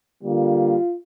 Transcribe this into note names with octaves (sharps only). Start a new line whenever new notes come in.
D3 G3 A#3 F4